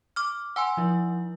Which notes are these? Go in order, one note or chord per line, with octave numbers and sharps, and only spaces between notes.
D6 F6
F#5 G#5 C6 E6
F3 E4